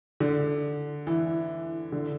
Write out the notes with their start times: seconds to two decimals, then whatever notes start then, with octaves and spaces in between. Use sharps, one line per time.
0.20 D3
1.07 E3
1.92 D3